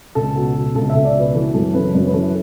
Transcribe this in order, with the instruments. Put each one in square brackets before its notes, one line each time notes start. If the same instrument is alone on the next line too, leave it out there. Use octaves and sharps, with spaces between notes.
[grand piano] C#2 A4
B2
B2
C#2 A4
C#2 E5
D5
B2 B4
E3 A4
F#2 A4
C#3 B4
F#2 B4
B4
E3 A4